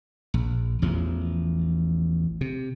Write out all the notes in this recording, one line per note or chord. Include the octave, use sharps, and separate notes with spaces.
A#1
A1 E2 F3
C3